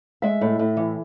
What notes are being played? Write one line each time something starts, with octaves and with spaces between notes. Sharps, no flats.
G#3 E5
A2
A2
E3